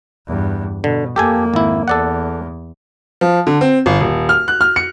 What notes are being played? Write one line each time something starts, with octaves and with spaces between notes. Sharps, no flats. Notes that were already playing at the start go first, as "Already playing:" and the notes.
E2 G2
B2 D3
F2 A#3 G4 A4 G#5
G#1 E4
E2 A4 D5 F#5
F3
D3
C4
G1
D#1
F6
F#6
F6
C#7